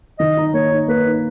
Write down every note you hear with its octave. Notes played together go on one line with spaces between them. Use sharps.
D#3 D#5
D#4
A#3 C#5
D#4
A#3 B4
D#4